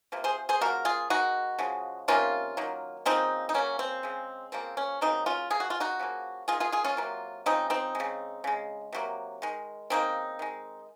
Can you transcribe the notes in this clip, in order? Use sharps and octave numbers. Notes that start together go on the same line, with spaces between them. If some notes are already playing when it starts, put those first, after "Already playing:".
C3 F3 A#3
G#4 C5
G#4 C5
C#3 F3 A#3 F#4 A#4
F4 G#4
D#3 G#3 D#4 F#4
C#3 F3 G#3
C3 D#3 A#3 C#4 F4
D#3 F#3 A#3
C#3 F3 A#3 C4 D#4
D#4
C#3 F#3 A#3 C#4
C4
C#3 G#3
C#3 F3 A#3 C4
C#4
C#3 F#3 A#3 C4 D#4
C#4 F4
C#3 F3 A#3 G#4
F#4
F4
D#4 F#4
C#3 F3 A#3
G#3 F4 G#4
D#3
F4 G#4
F4 G#4
C#4 F4
C3 F#3 A#3
C#3 F3 G#3 C4 D#4
C4 D#4
G#3
C#3
C#3 G#3
C3 F#3 A#3
D#3 G#3
C#3 F3 A#3 C4 D#4
D#3 G#3